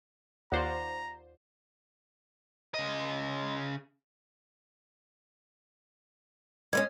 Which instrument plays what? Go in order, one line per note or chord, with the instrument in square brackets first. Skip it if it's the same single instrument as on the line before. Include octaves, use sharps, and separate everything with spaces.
[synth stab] D#2 C5 [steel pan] F4 D5 F#5 [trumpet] A#5
[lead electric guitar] C#3 D#5
[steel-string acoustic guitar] G3 G#3 C#4 [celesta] G#6